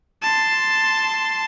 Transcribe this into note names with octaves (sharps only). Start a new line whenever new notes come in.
A5 C6